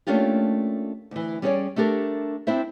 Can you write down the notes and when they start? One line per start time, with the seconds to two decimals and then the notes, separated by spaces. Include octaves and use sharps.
0.07 A3 A#3 C#4 D4 F4 G4
1.11 D2 E3
1.42 G3 C#4 G#4 B4 C#5 D5
1.76 A3 D4 G4 A4 A#4
2.47 C4 D4 E4 C5 E5